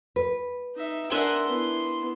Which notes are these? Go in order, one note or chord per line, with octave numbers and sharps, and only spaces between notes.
B4
D#4 E5
D4 A#4 E5 F#5 G#5 C6
B3 E4